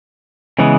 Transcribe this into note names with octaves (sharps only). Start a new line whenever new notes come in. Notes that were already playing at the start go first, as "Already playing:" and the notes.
C#3 E3 G#3 B3